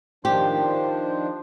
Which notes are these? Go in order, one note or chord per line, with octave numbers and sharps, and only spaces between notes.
D#3 F3 D4 G4 C5